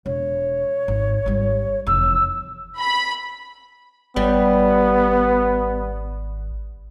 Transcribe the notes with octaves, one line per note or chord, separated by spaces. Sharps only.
E1 C#5
G#1
G#1 G3
F1 E2 E6
B5
G#1 G3 B3